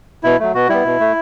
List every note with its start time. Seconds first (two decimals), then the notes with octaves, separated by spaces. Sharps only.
0.23 B2 E4
0.39 F#3 A3
0.54 B2 F#4
0.69 G3 B3 E4
0.85 B2
1.00 A3